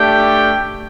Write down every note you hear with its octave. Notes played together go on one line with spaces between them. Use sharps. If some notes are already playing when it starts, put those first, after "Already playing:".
Already playing: A3 D4 G4 G5